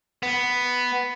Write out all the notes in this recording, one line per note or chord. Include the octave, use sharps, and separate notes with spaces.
B3